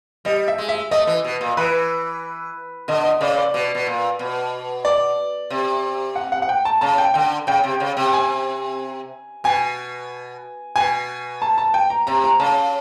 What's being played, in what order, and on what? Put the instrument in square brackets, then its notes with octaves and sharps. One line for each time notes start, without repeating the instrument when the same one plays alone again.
[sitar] G3 [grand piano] D#5
[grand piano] E5
[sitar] G#3
[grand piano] E5
[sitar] A3 [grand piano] D#5
[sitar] E3
B2
A#2
[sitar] E3 [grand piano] B4
[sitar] D3 [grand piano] D#5
[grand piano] D#5
[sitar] C#3 [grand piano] D5
[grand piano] D5
[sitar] B2
B2
A#2
B2
[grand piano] D5
[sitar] C3
[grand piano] F#5
F#5
F#5
G5
A5
[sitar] C#3 [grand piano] A5
[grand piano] G5
[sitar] D3 [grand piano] G5
[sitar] C#3 [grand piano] G5
[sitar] C3
C#3
C3
[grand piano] G#5
[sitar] B2 [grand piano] G#5
[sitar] B2 [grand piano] G#5
[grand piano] A5
A5
G5
A#5
[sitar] C3 [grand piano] A#5
[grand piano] A#5
[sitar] C#3 [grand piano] A5